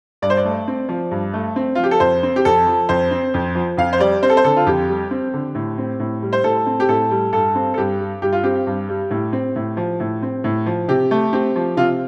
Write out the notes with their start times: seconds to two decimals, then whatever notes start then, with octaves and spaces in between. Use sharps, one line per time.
0.22 G2 D5
0.30 C5
0.37 D5
0.45 A3
0.68 C4
0.89 F3
1.11 G2
1.34 A3
1.56 C4
1.75 F3 F4
1.83 G4
1.91 A4
2.00 F2 C5
2.23 C4
2.36 G4
2.45 F2 A4
2.67 F3
2.89 F2 C5
3.11 C4
3.34 F2
3.55 F3
3.77 F2 F5
3.93 C5
4.00 G3 D5
4.22 C4 C5
4.30 A4
4.37 C5
4.44 D3 A4
4.56 F4
4.66 F2 G4
4.89 G3
5.11 C4
5.34 D3
5.55 A2
5.78 C4
6.00 A2
6.22 G3
6.33 C5
6.44 A2 A4
6.66 C4
6.80 G4
6.89 A2 A4
7.11 G3
7.33 G2 A4
7.55 C4
7.74 A4
7.78 G2 G4
8.00 G3
8.22 G2 G4
8.32 F4
8.44 C4 G4
8.67 G2
8.89 G3
9.11 A2
9.33 C4
9.56 A2
9.77 F3
10.00 A2
10.22 C4
10.44 A2
10.66 F3
10.88 C3 G4
11.11 A3
11.33 C4 G4
11.56 F3
11.77 C3 F4